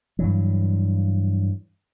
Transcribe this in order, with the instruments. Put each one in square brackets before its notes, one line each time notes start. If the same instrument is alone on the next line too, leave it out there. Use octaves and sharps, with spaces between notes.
[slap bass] G2 E3 F#3